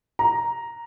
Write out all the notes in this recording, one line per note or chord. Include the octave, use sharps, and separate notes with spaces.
A#5